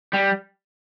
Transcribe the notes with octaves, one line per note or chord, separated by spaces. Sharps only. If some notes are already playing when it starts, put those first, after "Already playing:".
G3